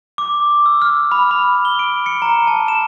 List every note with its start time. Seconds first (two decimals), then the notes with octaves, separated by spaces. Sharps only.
0.18 D6
0.66 E6
0.82 F6
1.12 B5
1.31 B5
1.65 G7
1.79 D7
2.06 C#7
2.22 A#5
2.47 A5
2.68 E7